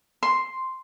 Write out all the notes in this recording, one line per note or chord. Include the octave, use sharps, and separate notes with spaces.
C6